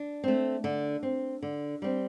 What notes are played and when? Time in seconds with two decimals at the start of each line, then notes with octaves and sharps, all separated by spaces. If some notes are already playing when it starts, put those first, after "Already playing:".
Already playing: D4
0.24 A3 C4
0.64 D3
1.03 C4
1.43 D3
1.82 G3 C4